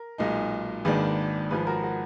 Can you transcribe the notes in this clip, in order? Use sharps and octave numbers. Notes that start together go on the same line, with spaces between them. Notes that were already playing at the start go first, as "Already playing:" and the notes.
Already playing: A#4
B1 A#2 G#3 D#4
G#1 G#2 D#3 A#3 D4 G#4 B4
G#1 G#2 F3 G#4 B4
F#4 A#4
F#4